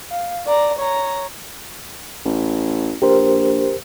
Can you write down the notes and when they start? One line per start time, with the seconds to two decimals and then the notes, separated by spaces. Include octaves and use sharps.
0.10 F5
0.47 D5 A#5
0.78 C#5 A#5
2.25 A1
3.02 A#1 G4 A#4 C5